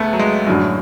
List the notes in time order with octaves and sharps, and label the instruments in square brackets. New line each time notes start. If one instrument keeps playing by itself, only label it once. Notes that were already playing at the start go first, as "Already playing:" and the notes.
Already playing: [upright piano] C#2 [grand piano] A3 B3
[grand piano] F#3
G#3
[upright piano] F#2 D3 F#3 [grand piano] A2